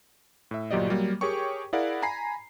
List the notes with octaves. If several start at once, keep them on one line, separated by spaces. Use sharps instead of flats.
A2 E5
G1 A#2 F#3 G4 D5 D#5
F#3 G3 A#3
G4 G#4 A#4 C#5 G5 C#6
E4 G#4 A#4 D5 F5 F#5
G#5 A#5 B5 C7